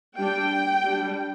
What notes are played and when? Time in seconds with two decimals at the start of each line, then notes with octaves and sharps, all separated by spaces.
0.18 G3 D4 G5
0.84 G3 D4